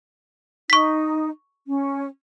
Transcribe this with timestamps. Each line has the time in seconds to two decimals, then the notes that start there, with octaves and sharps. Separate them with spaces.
0.70 D#4 C#6 B6
1.67 C#4